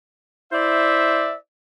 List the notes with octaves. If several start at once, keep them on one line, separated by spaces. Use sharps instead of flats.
E4 C5 D5 E5